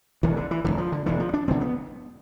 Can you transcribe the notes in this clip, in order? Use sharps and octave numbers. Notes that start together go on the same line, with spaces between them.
E1 D2 D3 E3
D3
E3
E1 D2 D3 E3
F3
D3
E1 D2 D3 E3
F3
D4
E1 D2 D3 C4
B3